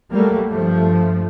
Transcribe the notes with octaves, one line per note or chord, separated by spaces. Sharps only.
F#3 G3 A3 A#3
G2 F3 A3